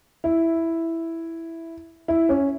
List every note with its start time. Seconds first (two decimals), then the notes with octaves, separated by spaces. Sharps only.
0.24 E4
2.08 E4
2.29 C#4